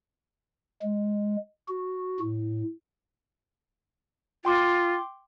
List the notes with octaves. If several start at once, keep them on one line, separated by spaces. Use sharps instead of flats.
G#3
F#4
A2
F4 G5 C6 D6